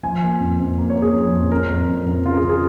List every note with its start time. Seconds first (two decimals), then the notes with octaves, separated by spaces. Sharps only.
0.03 F3 G#5
0.22 A#3
0.40 F2
0.59 F2
0.78 A#3
0.90 C#5
0.96 A#3
1.02 G#4
1.14 F3
1.32 F2
1.51 F2 A#4
1.69 F2
1.89 F3
2.06 F2
2.25 C#3 F4
2.33 A#4
2.37 G#4
2.43 C#3
2.49 G#4